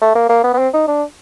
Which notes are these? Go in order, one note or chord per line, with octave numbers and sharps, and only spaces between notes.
A3
A#3
A#3
B3
B3
C4
D#4
D4